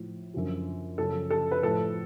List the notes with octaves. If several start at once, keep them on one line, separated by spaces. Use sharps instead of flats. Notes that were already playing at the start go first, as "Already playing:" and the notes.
Already playing: A2 F3
F#2 D3 F3
F#2 C#3 F3 A4
A4
B4
A2 F3 A4